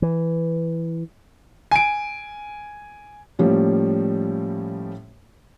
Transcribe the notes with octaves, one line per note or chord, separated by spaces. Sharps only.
E3
G#5 D7
A2 F3 G3 A#3 C#4